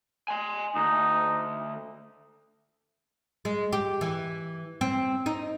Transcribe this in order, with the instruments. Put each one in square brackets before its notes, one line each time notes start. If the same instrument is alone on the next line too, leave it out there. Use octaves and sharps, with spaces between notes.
[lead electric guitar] G#5 C6
[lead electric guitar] D2 [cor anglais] D#4
[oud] G#3
G4
E3
C4
D#4